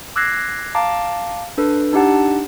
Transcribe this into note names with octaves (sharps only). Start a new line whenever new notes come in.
D6 E6 F#6 G#6 A#6 C7
F5 A5 A#5 D6
D4 A4 B4
D4 D#4 G4 F#5 A5